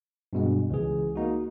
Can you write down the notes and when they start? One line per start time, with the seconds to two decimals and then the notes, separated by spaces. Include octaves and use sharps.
0.33 G2 B2 G#3
0.70 C#2 E3 G#4
1.16 A#3 D#4 F#4